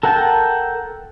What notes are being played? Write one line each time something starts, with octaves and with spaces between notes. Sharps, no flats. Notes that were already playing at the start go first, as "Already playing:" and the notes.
A4 A#4 F#5 G5 A5